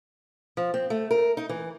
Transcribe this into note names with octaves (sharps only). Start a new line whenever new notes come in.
F3
C4
A3
A#4
D#4
E3